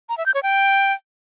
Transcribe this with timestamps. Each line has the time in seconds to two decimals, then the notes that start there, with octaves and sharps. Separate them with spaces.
0.09 A#5
0.18 E5
0.26 G6
0.34 C#5
0.43 G5